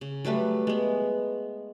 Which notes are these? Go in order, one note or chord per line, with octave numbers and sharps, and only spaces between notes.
C#3
F#3 G3 A3 B4
G#3 B3